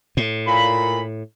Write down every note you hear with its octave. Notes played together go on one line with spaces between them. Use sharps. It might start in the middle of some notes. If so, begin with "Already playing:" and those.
A2
A#2 B5